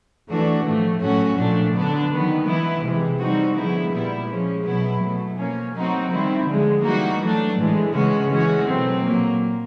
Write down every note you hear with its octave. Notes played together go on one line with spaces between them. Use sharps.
E3 A3 D4 F#4
A2 F3 A3
A2 F#3 A3 C#4 F#4
A#2 F3 A3 D4
D3 F#3 B3 D4
D#3 F#3 B3
E3 G#3 B3 E4
C3 E3 G#3
G3 C4 D#4 F#4
D3 F3 G#3 B3 E4
A#2 G3 B3 E4
F3 G#3 C#4
B2 F#3 B3 E4
B2 F#3 A3
F3 A#3 C#4
F#3 A3 C4 D#4 F#4
D#3 G3 C4 E4
D3 F3 G#3
E3 G3 A#3 D#4 F#4
F#3 A3 D4
A2 E3 G#3
C#3 E3 G#3 C#4 F#4
E3 G#3 C#4 F#4
B2 F#3 A3 C4
A#2 F#3 A#3